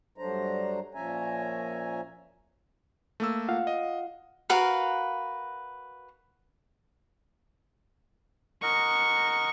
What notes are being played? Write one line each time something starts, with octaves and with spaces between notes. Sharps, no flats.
G2 F#3 A3 D4 C5 A#5
A#2 F3 C#4 E5 G#5 A#5
A3 A#3 E6
F4 F5 F#5
D#5
F#4 A#4 B4 F5
A#4 D#5 F#5 C#6